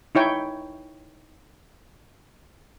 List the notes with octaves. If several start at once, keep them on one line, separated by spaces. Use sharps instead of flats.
D#4 E4 C#5 G5